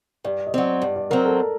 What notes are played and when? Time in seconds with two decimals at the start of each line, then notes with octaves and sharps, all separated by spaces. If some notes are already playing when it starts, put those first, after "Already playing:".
0.24 G2 D5
0.47 D#5
0.54 F#3 C4 D5
0.82 G2 D5
0.96 D5
1.10 F#3 C4 A#4
1.25 A4